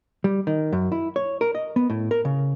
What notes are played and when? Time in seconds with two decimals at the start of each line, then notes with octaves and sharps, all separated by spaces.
0.24 G3
0.47 D#3
0.73 F#2
0.92 E4
1.16 C#5
1.41 A#4
1.55 D#5
1.76 B3
1.90 A2
2.11 A#4
2.25 C#3